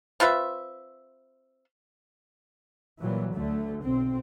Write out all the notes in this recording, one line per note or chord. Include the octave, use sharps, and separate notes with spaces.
C4 F4 B4 E5
A#2 E3 F#3 G3
D2 D3 A3
B1 C4